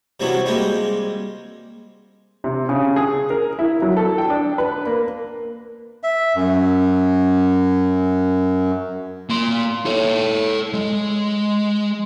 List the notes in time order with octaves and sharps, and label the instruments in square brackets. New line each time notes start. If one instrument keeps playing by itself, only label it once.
[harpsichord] C3 E3 F#3 G3 B3
G3 G#3 A#3 C4
[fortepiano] C3
C#3
G#4
A#4
E4
F#3
A4
G5
D4
B4
A#3
[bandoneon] E5
F#2
[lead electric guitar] A#3 C6
A4 C#5
G#3